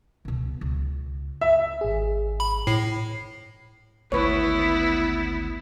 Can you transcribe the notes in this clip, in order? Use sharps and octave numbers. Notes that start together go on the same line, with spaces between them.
C#2 B2
C#2
E5
G#1 G#4
B5
A2 C7
G#1 D2 A3 B3 E4 B4 C#5